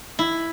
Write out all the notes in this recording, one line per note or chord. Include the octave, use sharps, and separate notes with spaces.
E4